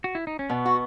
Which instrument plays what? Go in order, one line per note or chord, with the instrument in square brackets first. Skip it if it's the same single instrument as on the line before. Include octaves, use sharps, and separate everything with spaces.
[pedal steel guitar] F#4
E4
D#4
C#4
[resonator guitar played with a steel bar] B2 [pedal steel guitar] B3
[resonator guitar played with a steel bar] F#4